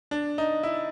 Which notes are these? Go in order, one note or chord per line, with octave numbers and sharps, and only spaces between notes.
D4
D#4
E4